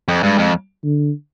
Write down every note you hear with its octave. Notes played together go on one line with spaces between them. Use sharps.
F2
G2 G#3
F2
D3